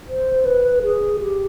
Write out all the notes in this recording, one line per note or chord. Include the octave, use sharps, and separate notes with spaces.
C5
B4
G#4
G4